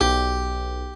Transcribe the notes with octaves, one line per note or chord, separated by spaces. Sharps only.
B1 G4